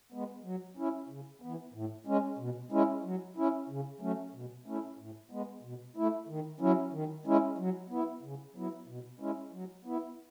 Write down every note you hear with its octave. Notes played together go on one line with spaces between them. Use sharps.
G#3 B3
F#3
C#4 E4
C#3
E3 B3
A2
G#3 C#4
B2
G#3 C#4 E4
F#3
C#4 E4
C#3
F#3 A3 C#4
B2
A3 C#4 E4
A2
G#3 B3
B2
A3 E4
D#3
F#3 C#4 E4
D#3
G#3 C#4 E4
F#3
B3 E4
C#3
F#3 B3 E4
B2
G#3 C#4 E4
F#3
B3 E4